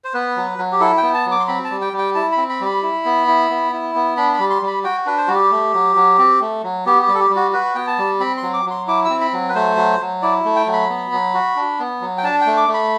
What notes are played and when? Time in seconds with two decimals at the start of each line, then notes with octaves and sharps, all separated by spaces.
0.04 C5
0.14 B3 B4
0.36 F#3
0.58 F#3
0.72 G4
0.80 E4 A4
0.97 G5
1.03 B3
1.14 A5
1.26 F#3
1.31 D6
1.40 C6
1.47 C4 B5
1.64 A5
1.70 G3
1.81 G5
1.93 G3
1.98 G5
2.15 E4 A5
2.32 B5
2.37 C4
2.49 B5
2.61 G3 B5
2.83 E4
3.05 B3
3.28 E4
3.50 B3
3.72 E4
3.95 B3
4.17 D4 B5
4.33 B5
4.40 G3
4.50 C6
4.62 G3
4.67 B5
4.84 F#4 G5
5.06 D4 B4
5.17 C5
5.27 G3 F#4
5.34 G4
5.51 A3
5.74 F#3
5.96 F#3
6.18 C4
6.41 A3
6.63 F#3
6.86 B3 G4
7.02 G4
7.08 G3
7.14 A4
7.20 G4
7.30 G3
7.36 F#4
7.53 F#4 B4
7.75 B3 G5
7.87 A5
7.99 G3
8.20 C4 B5
8.37 C6
8.43 F#3
8.54 D6
8.66 F#3
8.71 C6
8.87 E4 D6
9.05 E6
9.10 C4
9.21 B5
9.33 F#3
9.49 B4
9.55 A3 C5
9.77 F#3
10.00 F#3
10.22 E4 D5
10.45 A3
10.56 G5
10.67 F#3
10.73 B5
10.90 B3
11.12 F#3
11.34 F#4
11.56 D4
11.79 B3
12.01 F#3
12.18 G5
12.23 D4 A5
12.41 G5
12.46 A3
12.57 D6
12.68 A3
12.74 B5